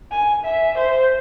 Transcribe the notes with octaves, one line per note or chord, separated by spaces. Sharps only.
G#5
E5
C5